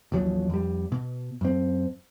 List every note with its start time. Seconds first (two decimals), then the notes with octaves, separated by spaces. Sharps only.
0.12 A1 D#2 F3 F#3
0.50 F2 G3
0.92 B2
1.41 F#2 C4